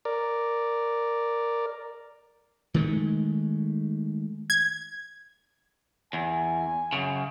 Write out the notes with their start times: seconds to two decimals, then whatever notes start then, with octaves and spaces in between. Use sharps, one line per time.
0.05 A#4 D5
2.74 D#3 G#3 A3
4.50 G#6
6.13 E2 G#5
6.93 F#2 C#3